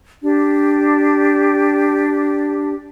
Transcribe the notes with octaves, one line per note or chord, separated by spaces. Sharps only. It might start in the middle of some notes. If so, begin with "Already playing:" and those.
D4 G4